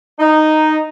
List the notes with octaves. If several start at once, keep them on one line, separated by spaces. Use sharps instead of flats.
D#4